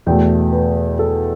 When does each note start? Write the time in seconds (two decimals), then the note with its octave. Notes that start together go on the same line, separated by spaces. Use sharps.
0.06 E2 B2 A3 G5
0.52 B4
0.99 A4